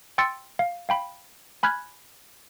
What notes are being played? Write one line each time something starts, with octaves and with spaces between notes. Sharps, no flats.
G5 C6 E6 A6 C#7
F5
F5 G5 B5
G#5 B5 F6 F#6 G#6